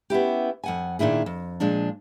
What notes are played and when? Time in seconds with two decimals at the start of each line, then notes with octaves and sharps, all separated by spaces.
0.10 B3 C#4 E4 G4
0.64 F2 F#5 G#5
0.99 A#2 D#3 D4 E4 G#4
1.26 F2
1.60 A#2 F3 G#3 D4